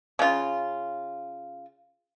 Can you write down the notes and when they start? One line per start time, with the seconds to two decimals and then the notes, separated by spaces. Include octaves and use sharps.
0.19 C#3 F4